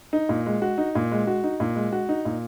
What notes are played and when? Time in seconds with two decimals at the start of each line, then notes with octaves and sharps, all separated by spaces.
0.13 D#4
0.29 A#2
0.46 G#3
0.62 F#4
0.78 D#4
0.95 A#2
1.12 G#3
1.27 F#4
1.44 D#4
1.60 A#2
1.76 G#3
1.93 F#4
2.09 D#4
2.25 A#2